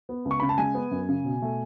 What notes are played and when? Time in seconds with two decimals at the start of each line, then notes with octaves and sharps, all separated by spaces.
0.09 B3
0.25 C#2
0.31 C#6
0.40 C#3 B5
0.49 A5
0.58 G#3 G#5
0.75 B3
0.91 F#2
1.09 C#3
1.25 B2
1.42 A3